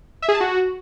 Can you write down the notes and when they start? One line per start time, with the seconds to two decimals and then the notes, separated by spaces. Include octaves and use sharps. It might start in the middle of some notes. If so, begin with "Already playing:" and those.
0.22 E5
0.28 G#4
0.35 A5
0.41 F#4